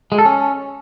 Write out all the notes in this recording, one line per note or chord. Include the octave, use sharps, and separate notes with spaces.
G#3
A4
C#4